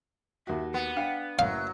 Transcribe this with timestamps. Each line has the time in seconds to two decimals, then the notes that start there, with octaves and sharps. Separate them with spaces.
0.47 D#2 F#4 E5
0.74 B3 F#5
0.96 D4 F5 G5
1.39 F#1 F#3 A3 E4 F5